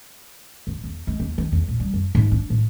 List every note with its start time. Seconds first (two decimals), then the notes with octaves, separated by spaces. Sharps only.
0.67 F#2
0.84 E2
1.07 G#3
1.20 D#2
1.38 D#3
1.52 E2
1.68 A#2
1.80 G3
1.94 F#2
2.15 G#2
2.31 D4
2.50 A2